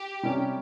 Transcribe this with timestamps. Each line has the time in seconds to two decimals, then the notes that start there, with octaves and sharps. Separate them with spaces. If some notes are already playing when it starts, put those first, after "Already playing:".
Already playing: G4
0.23 C3 G3 C#4